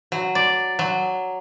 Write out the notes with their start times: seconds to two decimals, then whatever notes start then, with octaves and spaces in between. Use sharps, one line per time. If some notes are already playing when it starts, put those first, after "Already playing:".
0.12 F#3
0.35 D5
0.79 F#3